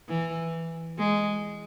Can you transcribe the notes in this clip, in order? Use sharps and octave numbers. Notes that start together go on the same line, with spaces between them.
E3
G#3